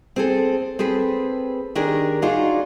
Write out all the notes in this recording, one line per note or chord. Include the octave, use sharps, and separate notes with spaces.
C4 G#4 A4
C4 G#4 A4 B4
D#3 D4 G4 G#4 A#4
D4 D#4 F4 F#4 G#4 D5